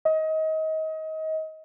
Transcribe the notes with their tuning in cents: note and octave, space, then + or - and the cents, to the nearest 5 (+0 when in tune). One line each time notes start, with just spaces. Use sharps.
D#5 +25